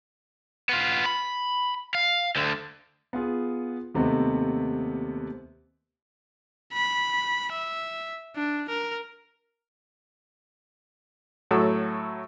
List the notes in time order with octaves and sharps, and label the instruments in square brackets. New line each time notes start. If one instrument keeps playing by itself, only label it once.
[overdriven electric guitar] B3 F4
B5
F5
D2 D3
[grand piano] B3 F4 G#4
D#2 C3 A3 B3 C4 D#5
[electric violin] B5
E5
D4
A#4
[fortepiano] A2 F#3 F#4 A4 E6